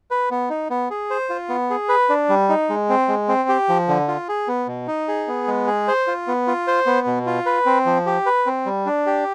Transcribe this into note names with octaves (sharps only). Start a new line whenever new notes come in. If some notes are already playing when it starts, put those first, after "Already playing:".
B4
B3
D#4
B3
G#4
C5
F4
B3
G#4
B4
D4
G3
D#4
G#3
C4
G#3
C4
G4
F3
D3
F4
G#4
B3
B2
D#4
G#4
B3
G#3
G#4
C5
F4
B3
F4
C5
B3
B2
F4
B4
C4
F3
G4
B4
C4
G3
D4
G4